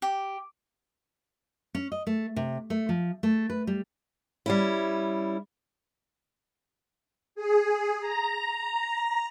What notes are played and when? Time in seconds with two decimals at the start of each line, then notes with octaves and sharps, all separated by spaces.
0.02 G4
1.75 C#4
1.92 D#5
2.07 A3
2.36 C3
2.70 A3
2.89 F3
3.23 A3
3.50 B4
3.67 G3
4.46 G3 C#4 E4
7.35 G#4
8.00 A#5